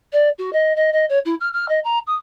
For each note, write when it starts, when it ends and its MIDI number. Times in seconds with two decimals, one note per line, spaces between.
0.13 0.29 74
0.38 0.53 66
0.53 0.75 75
0.76 0.92 75
0.93 1.05 75
1.09 1.19 73
1.25 1.35 64
1.40 1.49 89
1.53 1.68 89
1.69 1.80 75
1.84 1.99 82
2.07 2.15 87